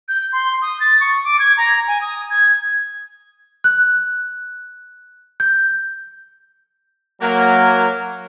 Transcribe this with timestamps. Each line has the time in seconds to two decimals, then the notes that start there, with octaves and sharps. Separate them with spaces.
0.08 G6
0.33 C6
0.62 D#6
0.80 A6
1.00 C#6
1.24 D6
1.39 G#6
1.57 A#5
1.88 G#5
2.01 D#6
2.30 G#6
3.64 F#6
5.40 G6
7.22 F#3 A#3 A#4